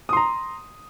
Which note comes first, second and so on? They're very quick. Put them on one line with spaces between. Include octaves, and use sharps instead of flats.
D#6 C6 A#5